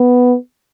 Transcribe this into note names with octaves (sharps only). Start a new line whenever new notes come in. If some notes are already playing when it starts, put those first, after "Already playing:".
Already playing: B3